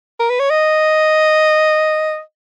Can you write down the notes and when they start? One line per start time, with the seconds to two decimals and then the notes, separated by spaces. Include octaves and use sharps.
0.20 A#4
0.30 B4
0.40 C#5
0.50 D#5